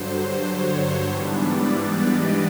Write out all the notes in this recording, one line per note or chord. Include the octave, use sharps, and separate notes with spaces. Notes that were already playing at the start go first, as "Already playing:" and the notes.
Already playing: G2 D3 F#3 C5
C5
C#5
G#2 E3 G3 B3 D4
D5
D5
D#5